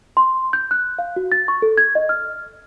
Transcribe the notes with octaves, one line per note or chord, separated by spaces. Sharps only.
C6
G6
F#6
F5
F#4
A6
C#6
A4
G#6
D#5
F6